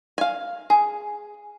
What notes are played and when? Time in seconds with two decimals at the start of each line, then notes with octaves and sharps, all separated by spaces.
0.18 F5 G#5
0.70 G#4